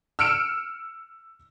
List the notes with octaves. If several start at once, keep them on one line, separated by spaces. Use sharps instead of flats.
E6 F6 C#7 D7 E7